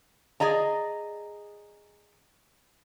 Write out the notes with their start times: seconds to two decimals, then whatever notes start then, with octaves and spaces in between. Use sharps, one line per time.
0.40 G#4 D5 D#5 A#5